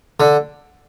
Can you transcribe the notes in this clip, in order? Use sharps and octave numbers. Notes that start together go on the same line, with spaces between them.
D3